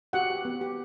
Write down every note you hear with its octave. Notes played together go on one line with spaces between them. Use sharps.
F#4 G4 F#5
G4
B3
G4